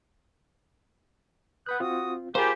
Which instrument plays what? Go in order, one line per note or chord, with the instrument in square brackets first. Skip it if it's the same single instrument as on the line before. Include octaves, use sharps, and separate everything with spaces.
[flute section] B4 D#6 G6 [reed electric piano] F#5 B5 F#6
[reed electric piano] C4 F4 [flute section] F#4 D#6
[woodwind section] A#3 F4 G4 [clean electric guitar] G#4 C5 [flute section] G#5 B5